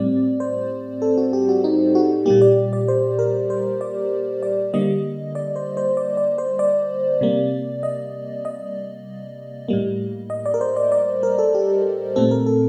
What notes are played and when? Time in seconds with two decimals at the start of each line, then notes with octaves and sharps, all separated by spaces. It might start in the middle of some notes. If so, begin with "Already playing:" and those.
Already playing: A2 G3 C4 D5
0.40 C5
1.02 A4
1.18 F#4
1.33 G4
1.49 F#4
1.64 D#4
1.95 F#4
2.26 A#2 G3 A#3 G4
2.41 D5
2.73 D5
2.88 C5
3.19 A#4
3.50 C5
3.81 D5
4.43 D5
4.74 D3 G3 A#3 D#5
5.35 D5
5.56 C5
5.77 C5
5.97 D5
6.17 D5
6.38 C5
6.59 D5
7.21 C3 G3 A#3
7.83 D#5
8.45 D#5
9.68 A2 G3 A#3
10.30 D#5
10.46 D5
10.54 A#4
10.61 C5
10.76 D5
10.92 D5
11.23 A#4
11.39 A4
11.55 G4
12.16 A#2 A3 C4 A4
12.31 A#4
12.46 A4